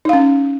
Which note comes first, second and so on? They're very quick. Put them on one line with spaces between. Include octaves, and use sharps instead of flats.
D#4 F5 C#4